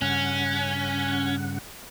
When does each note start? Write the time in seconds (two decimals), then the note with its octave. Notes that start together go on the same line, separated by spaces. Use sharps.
0.02 G2 C#3 C#4 F#5